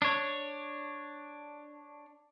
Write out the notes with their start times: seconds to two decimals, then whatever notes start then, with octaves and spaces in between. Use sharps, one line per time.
0.02 D4 C#5